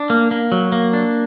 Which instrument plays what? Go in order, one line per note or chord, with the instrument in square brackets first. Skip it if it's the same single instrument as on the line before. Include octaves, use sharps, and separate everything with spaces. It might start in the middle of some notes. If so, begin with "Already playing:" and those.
Already playing: [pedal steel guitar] D4
A#3
A#3
F#3
A#3
D4